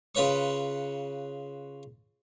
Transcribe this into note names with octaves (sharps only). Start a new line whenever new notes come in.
C#3 F4 B4 C#5 C#6